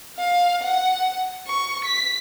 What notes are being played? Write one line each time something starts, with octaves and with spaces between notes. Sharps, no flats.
F5
F#5
C#6
B6